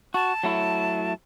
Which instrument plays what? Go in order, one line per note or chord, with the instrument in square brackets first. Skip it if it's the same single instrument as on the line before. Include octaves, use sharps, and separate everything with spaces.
[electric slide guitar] F#4 [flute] A5
[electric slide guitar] F#3 A3 E4